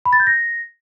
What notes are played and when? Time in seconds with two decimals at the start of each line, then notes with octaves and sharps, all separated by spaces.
0.05 B5
0.13 A6
0.20 G6
0.27 A#6